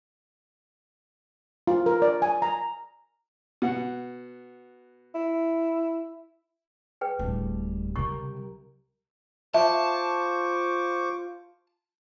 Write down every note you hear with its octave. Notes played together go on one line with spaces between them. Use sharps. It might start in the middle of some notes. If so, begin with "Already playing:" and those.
F4
A#4
D5
G#5
A#5
B2 F#5
E4
G#4 B4 G5
D1 G3 A3
C2 C#3 F#3 G4 A#4 C#6
F4 C5 E5 A5 C#6 D6